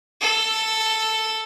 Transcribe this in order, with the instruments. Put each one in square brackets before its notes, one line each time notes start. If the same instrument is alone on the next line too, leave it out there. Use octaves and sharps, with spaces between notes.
[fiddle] A4